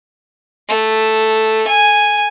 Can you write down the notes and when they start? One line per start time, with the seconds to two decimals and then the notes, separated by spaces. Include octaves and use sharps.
0.69 A3
1.67 G#5